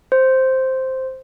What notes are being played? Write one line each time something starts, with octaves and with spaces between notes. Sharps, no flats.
C5